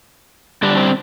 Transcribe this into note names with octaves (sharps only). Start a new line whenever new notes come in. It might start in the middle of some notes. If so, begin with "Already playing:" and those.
D3 G3 D4
C4